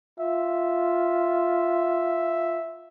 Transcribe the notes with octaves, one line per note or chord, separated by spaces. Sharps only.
F4 E5